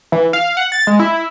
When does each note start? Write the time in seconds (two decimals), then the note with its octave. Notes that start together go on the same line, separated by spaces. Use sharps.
0.12 E3
0.33 F5
0.57 F#5
0.72 A6
0.87 G#3
0.99 E4